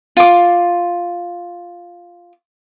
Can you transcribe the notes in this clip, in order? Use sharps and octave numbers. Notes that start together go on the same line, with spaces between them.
F4 D6